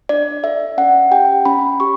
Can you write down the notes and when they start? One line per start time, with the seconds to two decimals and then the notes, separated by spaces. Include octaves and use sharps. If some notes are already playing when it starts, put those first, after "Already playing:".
0.09 D4 D5
0.44 A4 E5
0.78 C#4 F#5
1.11 G4 G5
1.46 C#4 B5
1.80 G4 C#6